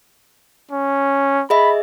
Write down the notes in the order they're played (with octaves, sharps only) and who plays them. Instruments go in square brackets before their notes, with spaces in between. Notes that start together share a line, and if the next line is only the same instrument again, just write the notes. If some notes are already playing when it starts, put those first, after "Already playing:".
[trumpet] C#4
[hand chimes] G#4 D#5 E5 [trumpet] B5